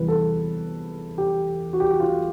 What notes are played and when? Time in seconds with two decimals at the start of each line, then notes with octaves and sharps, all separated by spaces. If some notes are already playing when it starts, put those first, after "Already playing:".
Already playing: E2 C3 E3 G3 B4
0.08 A4
1.18 G4
1.73 F#4
1.80 G4
1.89 F#4
2.00 F4